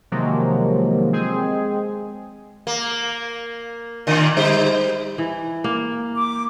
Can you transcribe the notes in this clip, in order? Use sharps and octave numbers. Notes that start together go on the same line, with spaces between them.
C3 D#3 F3 F#3 G#3 A#3
G#3 C4 G#4
A#3
A#2 D3 D#3
G3 D#4 C5
E3
A#3
D6